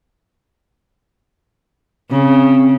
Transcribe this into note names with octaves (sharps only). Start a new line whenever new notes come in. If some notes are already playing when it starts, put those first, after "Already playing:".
C#3 C4